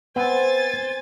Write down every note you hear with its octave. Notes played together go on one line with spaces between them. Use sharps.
B3 C4 C5 G#5 A6